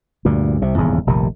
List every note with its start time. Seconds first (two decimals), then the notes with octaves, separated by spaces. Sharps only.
0.25 D2 G2 A#2
0.62 C2 C3
0.77 D#1 E2 G#2 C#3
1.07 F1 A#1 C3 D#3